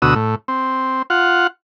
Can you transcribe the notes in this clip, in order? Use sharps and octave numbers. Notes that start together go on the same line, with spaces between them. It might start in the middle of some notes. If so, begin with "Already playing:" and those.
D2 B2 F#4 D#6 E6
A2
C4
F4 F#5